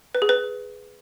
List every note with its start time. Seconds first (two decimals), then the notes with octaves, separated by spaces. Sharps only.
0.15 B4
0.22 G#4
0.29 B4